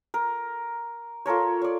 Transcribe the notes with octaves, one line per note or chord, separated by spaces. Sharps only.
A#4
F4 A4 A#4 C#5
C#5 D5